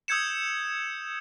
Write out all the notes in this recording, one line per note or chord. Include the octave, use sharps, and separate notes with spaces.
D#6 E6 G6 G#6 C#7 E7